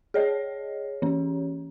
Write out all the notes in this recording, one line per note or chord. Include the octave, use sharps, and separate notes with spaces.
G#4 C#5 D#5
E3 C#4